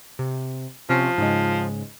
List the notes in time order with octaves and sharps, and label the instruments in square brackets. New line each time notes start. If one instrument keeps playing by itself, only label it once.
[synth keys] C3
[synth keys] C3 C#4 [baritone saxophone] F3
[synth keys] G#2 C#3 G#3